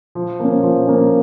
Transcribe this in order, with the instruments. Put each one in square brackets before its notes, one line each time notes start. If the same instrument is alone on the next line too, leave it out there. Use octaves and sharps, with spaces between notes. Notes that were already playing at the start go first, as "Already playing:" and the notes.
[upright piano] F3
A#3 C#4
F3
A#3 C#4